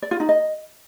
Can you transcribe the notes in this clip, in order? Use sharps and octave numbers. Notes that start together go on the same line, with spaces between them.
D5
F4
D#4
D#5